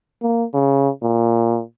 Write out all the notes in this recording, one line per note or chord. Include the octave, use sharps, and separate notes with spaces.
A#3
C#3
A#2